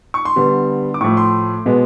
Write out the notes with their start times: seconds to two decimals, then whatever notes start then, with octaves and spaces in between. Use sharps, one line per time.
0.14 C#6
0.25 C6
0.36 D3 G3 B3
0.94 D6
1.01 A2 F3 A3 C#6
1.17 C6
1.66 B2 G#3 B3